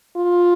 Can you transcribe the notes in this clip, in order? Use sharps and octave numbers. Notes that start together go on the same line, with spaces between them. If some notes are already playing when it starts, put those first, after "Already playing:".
F4